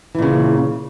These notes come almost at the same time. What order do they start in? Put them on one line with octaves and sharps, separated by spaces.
E3 A#2 C#3